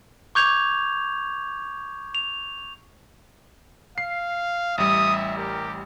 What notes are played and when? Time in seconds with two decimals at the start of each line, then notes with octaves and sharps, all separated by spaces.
0.35 C#6 D6 G6 G#6 F7
2.15 F7
3.98 F5 C7
4.78 A1 G3 E5 D#6
5.38 G4 A#4